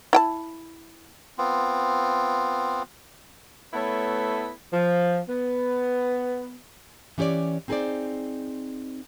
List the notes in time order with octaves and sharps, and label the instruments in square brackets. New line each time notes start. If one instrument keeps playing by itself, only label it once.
[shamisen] E4 G5 A5
[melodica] B3 C4 F4
[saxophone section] A3 B3 E4 A4 B4 C#5
F3
B3
[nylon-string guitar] E3 C#4 G4 C#5 D5
C4 D#4 G#4 B4 C5 D5